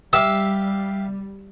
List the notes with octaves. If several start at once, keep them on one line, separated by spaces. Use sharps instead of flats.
G3 G4 E5 F5 E6